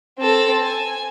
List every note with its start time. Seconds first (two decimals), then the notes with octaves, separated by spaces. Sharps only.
0.19 C4 A4
0.63 G#5